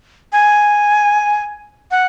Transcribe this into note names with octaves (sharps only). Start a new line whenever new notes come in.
G#5
F#5